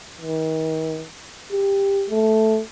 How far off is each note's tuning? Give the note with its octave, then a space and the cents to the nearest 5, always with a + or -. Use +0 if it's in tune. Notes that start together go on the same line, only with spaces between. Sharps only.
D#3 +40
G4 +15
A3 -5